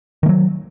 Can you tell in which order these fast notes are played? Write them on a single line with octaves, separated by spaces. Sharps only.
D#3 A3 F#3